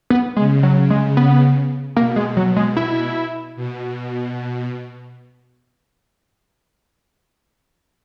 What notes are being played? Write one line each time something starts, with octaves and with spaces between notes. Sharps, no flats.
B3
C#3 G#3
F#3
G#3
B3
B2 A#3
G#3
F#3
G#3
E4
B2